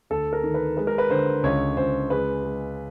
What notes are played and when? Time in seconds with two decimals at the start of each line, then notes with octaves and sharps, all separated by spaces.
0.10 D2 A4
0.33 A#4
0.43 D#3
0.54 B4
0.77 G#3 B4
0.87 A#4
0.98 B4
1.10 D3 C5
1.43 C#2 C#5
1.77 C#2 C5
2.10 G#3 B4
2.43 G#3